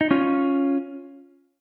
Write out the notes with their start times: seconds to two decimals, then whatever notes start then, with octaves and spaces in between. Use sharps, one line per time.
0.01 D#4
0.11 C#4 F4